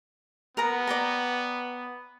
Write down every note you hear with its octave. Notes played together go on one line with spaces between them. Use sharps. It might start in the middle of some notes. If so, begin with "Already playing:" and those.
B3 A#4 F#5 A#5
D5 G5 A#5